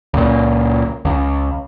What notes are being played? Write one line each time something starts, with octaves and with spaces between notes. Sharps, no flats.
C#2 A#2
C#2